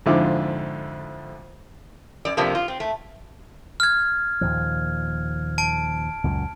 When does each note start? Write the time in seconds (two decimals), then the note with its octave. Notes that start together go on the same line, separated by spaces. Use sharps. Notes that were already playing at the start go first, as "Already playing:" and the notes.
0.06 F2 G#2 D3 E4 F4 D6
2.25 F#2 D5
2.37 F#2 C3 F3 A3 A#3 D4
2.55 F4
2.68 C4
2.80 A3
3.80 F6 G#6
4.41 D#2 A#2 F3
5.58 A5 D7
6.24 C#2 F#2 A#2